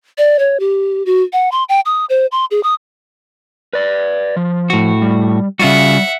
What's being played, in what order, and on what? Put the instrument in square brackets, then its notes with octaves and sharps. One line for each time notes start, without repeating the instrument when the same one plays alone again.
[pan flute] D5
C#5
G4
F#4
F#5
C6
G5
D#6
C5
C6
G#4
D#6
[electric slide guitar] B4 D5
F3
[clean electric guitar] A2 F#4
[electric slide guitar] G3
[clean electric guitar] C#3 F4 F#4 [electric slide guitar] G3 [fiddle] E5 F#5